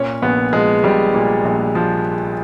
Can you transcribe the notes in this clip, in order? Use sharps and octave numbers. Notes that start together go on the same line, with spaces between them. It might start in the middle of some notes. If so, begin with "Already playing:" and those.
Already playing: A#2 C#4
A#1 B3
F3 G#3
A#1 G3
A#2
A#1
F3